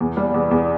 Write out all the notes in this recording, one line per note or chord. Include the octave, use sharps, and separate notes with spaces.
E2
G3
E2
E2